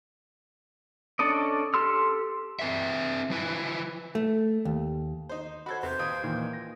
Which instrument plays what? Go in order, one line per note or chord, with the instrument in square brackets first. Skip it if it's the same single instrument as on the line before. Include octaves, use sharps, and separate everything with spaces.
[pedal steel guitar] C#4 D4 A4 D5 D#5
G4 A4 C6 E6 F6
[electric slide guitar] C4 B4 E5
F3 E4 B4
[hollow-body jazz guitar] A3
D#2
[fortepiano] D#4 C5
[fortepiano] F#4 A4 C5 [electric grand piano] F#5 G#6 [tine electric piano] B5
[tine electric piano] E2 [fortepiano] C3 [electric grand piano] B4 [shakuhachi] C5
[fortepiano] D#2 [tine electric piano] F5 D#6 G6
[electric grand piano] A#2 D#3 E3
A#6